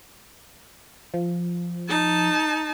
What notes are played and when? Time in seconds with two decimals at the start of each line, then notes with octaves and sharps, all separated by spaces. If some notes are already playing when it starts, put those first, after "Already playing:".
1.14 F3
1.89 D#4 A5